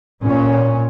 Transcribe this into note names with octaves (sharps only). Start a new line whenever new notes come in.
A#2 C#4